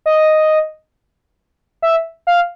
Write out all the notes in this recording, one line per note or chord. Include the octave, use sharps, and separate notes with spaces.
D#5
E5
F5